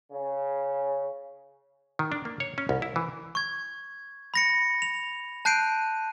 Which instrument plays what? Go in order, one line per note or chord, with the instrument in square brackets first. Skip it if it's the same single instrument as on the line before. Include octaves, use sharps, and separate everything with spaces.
[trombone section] C#3
[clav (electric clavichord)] D#3
D4
A#3
C#5
C#4
C2
E4
E3
[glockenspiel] C#6 G#6
B5 A#6 C#7
F7
A5 F#6 G6 C7 D7 D#7